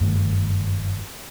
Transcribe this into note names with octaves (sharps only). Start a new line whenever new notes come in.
F#1 G2 D#3 A3